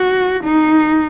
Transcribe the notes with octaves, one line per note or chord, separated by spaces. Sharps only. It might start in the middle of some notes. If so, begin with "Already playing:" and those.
Already playing: F#4
D#4